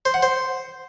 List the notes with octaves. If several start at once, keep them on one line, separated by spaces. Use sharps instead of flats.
C5
F#5
C5